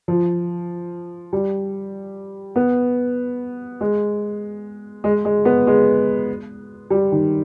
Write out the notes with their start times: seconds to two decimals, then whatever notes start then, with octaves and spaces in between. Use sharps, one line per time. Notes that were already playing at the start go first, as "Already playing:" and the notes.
0.08 F3
1.33 G3
2.56 B3
3.81 G#3
5.04 G#3
5.25 G#3
5.45 B3
5.67 G#3
6.90 G3
7.12 D#3